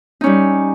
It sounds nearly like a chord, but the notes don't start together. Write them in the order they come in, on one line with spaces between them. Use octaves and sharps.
D#4 C#4 G3